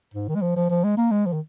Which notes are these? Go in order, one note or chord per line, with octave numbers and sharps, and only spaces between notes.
G#2
D#3
G#3
F3
F3
F3
G#3
A#3
G#3
F3
D#3